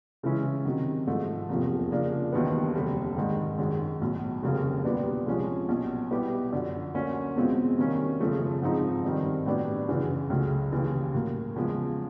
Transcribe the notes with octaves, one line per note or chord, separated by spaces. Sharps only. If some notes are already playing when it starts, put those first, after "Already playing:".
C#3 E3 G#3 C#4 E4
C3 D#3 F#3
G#2 F3 A3
F1 E2 C3 F3 A#3
C#3 F3 A#3 D4
E1 D#2 D#3 F#3 B3
F1 D#2 D3 G3
G#2 D#3 G#3
F#2 D#3 G#3
B1 A2 F#3
F1 D#2 C#3 F#3 A#3
A#2 G3 B3 D4 G4
C2 C3 F3 G#3 C#4
B1 A#2 F#3
B2 G3 B3 E4 G4
F#2 D3 F3
D2 D3 F#3 A#3 C#4
E2 B2 G#3 C4 F4
C3 D#3 G3 A#3 C#4
F#1 E2 C#3 F3 A3
G#2 F3 G#3 C4 D#4
G2 D#3 G3 C4
A2 F#3 B3 D4 G4
F#2 C#3 E3
C#2 C#3 F#3 A3
D#2 C#3 E3
A2 F#3 A#3
E2 C#3 F3 G#3